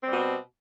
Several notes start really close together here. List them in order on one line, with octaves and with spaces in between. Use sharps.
C4 G3 B2